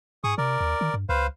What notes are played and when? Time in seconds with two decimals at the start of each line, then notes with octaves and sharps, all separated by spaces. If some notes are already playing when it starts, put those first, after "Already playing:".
0.24 G#2 G#4 C#6 D#6
0.38 C3 A#4 D5
0.61 D#2
0.81 D#3
0.94 G2
1.09 C#2 B4 C5 F5